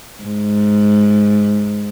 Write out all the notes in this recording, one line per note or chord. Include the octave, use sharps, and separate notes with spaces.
G#2